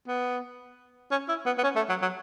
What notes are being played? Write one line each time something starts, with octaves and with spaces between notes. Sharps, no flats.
B3
C#4
E4
B3
B3
C#4
A3
F#3
F#3